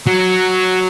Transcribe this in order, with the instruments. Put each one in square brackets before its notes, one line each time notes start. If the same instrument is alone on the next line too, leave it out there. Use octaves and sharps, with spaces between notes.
[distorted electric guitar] F#3